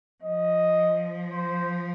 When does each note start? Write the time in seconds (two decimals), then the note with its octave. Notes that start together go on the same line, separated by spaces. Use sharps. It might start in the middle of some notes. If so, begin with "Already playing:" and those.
0.23 F3 D#5
1.32 C5